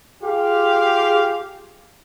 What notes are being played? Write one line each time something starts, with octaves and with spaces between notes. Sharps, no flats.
F4 G4 G#4 F5